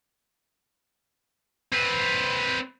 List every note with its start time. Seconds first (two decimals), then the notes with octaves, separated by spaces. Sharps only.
1.73 C4 B4